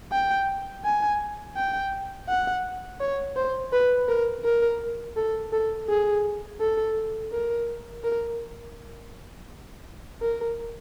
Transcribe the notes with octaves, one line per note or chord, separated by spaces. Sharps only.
G5
G#5
G5
F#5
C#5
C5
B4
A#4
A#4
A4
A4
G#4
A4
A#4
A#4
A#4